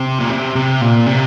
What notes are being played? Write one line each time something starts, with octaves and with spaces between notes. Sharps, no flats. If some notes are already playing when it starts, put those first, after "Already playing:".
Already playing: C3
A#2
C3
C3
A#2
C3